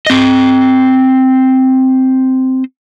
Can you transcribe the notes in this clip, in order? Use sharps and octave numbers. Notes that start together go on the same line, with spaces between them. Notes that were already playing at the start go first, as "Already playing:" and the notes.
C4 D#5